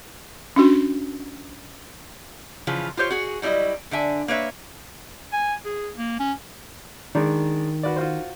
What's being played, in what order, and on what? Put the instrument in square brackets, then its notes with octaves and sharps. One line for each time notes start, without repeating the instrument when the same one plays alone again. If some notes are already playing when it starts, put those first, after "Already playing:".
[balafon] C#4 D4 F#4
[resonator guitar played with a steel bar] C#3 E3 F3 F4 G#4
F4 G4 C5 C#5
F#4 G#4
F#3 G3 D4 E4 D#5
D3 D4 E5 G#5
A#3 B4 C#5 E5
[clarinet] G#5
G#4
A#3
C#4
[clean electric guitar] D#3 [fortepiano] G#3 D4
[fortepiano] F#4 B4 D5
F4 F#4 C5